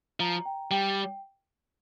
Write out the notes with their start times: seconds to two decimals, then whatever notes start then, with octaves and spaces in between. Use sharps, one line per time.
0.20 F3 A#5
0.45 G5
0.71 G3 G5